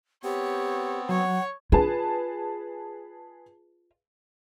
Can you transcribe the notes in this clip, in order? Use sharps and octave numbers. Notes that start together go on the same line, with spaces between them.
B3 C4 G4 C#5
F#3 C#5 F#5
F4 G#4 B4 A5